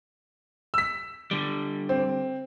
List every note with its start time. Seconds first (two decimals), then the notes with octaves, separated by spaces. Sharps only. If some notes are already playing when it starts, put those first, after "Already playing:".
0.74 E6 B6
1.31 D3 G3
1.89 C4